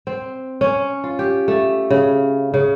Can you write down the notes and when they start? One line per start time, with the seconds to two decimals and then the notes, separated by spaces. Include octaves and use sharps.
0.07 C4
0.61 C#4
1.04 F4
1.19 G4
1.48 A3
1.90 C#3
2.54 C#3